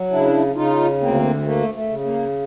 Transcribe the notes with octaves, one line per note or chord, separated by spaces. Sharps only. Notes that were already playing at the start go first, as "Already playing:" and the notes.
Already playing: F#3
C#3 D4 E4
C#3 D#4 F4
D2 A#3 C4
A3 A#3
A3
C#3
A#3